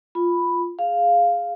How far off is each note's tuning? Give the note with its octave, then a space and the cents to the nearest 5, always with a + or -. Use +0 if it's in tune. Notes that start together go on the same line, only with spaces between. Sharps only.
F4 +0 B5 +0
G#4 +0 F5 +0